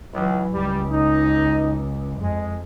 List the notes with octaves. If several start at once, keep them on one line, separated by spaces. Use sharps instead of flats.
C#2 E3 F#3
C#2 G3
D#4
F2 G#3